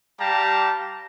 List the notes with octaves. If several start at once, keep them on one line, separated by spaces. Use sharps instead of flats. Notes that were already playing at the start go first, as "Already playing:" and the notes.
G3 G4 F5 A5 A#5